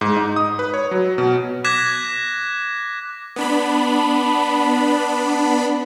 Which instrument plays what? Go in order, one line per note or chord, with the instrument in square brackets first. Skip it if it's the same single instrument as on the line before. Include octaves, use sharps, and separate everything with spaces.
[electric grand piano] G#2
D#4
D#6
B4
C#5
F#3
B2
[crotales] D6 F#6 G#6 A#6 B6 E7
[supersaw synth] B3 D4 B5